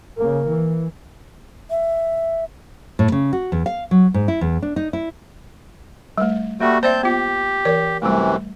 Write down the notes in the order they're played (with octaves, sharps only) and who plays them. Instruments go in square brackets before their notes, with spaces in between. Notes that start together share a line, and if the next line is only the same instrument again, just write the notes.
[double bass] C#3 A#3
E3
[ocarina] E5
[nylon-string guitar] A2
C#3
F#4
E2
F5
F#3
G#2
E4
E2
D4
D#4
E4
[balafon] G3 A3
[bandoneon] G3 A3 F#4 [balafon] A#3
[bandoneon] C4 A5 G6 [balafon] C5 D5 E5
[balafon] B3 F4 [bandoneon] G4
[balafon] E3 A#4 D5
[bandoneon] F#2 C3 E3 [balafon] G3 A3